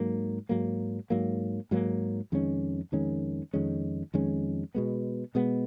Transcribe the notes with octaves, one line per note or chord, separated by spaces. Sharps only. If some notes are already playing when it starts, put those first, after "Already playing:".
Already playing: G#2 F#3 A#3
G#2 F#3 A#3
G#2 F#3 A#3
G#2 F#3 A#3
F2 D#3 G#3 C#4
F2 D#3 G#3 C#4
F2 D#3 G#3 C#4
F2 D#3 G#3 C#4
B2 G#3 B3
B2 G#3 B3